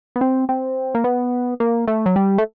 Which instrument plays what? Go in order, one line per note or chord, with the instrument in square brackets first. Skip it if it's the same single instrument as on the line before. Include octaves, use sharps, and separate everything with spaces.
[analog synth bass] B3
C4
C4
A#3
B3
A#3
A3
F#3
G3
A3